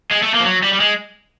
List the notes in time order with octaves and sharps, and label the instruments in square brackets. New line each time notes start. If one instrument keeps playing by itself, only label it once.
[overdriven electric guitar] G#3
A3
A#3
F3
F#3
G3
G3
G#3